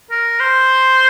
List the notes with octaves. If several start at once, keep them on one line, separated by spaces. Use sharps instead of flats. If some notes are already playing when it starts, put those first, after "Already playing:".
A#4
C5